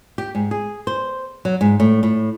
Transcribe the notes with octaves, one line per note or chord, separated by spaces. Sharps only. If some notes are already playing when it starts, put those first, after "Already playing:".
G4
G#2
G#4
C5
F#3
G#2
A2
A2